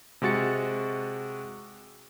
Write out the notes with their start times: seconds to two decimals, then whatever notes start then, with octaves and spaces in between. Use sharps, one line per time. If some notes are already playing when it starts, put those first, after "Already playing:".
0.22 C3 G#3 F#4 A6 C#7